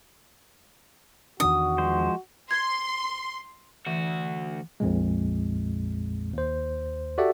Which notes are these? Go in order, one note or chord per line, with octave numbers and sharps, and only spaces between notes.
E2 D#3 D4 F#4 D#6
F3 G#3 C5
C6 G#6
D2 E3 F#4
A#1 F2 A#2 G#3
D#2 C5
F#4 G4 A4 D5 E5 F#5